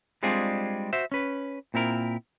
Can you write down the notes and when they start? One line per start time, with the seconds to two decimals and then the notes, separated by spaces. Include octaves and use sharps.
0.23 G3 G#3 C4 D4 F4 G#4
0.93 F#4 C5 E5
1.12 C#4 B4
1.74 A#2 C4 E4 A#4